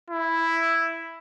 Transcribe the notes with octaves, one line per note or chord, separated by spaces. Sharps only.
E4